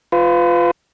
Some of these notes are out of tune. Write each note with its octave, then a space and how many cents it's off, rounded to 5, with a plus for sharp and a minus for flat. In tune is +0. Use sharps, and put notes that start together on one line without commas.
F4 +0 B4 +30